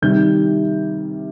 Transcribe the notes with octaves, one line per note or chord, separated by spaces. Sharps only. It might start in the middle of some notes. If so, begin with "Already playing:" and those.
C3 D#3 G3 G6